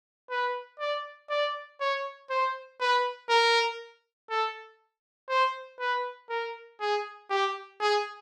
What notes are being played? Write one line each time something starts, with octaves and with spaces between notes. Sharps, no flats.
B4
D5
D5
C#5
C5
B4
A#4
A4
C5
B4
A#4
G#4
G4
G#4